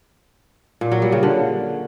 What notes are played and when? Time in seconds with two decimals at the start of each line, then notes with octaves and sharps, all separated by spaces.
0.81 A#2
0.92 F#3
1.02 G3
1.12 C#3
1.23 D3